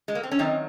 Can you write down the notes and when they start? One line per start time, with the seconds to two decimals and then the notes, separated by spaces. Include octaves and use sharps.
0.08 G#3
0.15 A#3
0.23 C4
0.31 C#4
0.39 F#2 D#3 F#3 C4 D#4